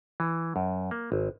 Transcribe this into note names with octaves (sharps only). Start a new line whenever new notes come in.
E3
F#2
A#3
G#1